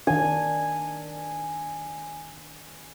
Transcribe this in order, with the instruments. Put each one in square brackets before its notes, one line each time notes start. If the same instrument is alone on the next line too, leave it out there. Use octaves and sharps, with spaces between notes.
[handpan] D#3 D4 [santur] G#5